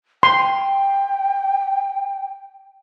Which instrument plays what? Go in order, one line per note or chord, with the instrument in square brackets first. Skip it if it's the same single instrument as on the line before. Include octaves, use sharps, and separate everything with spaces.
[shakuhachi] G5 [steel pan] C6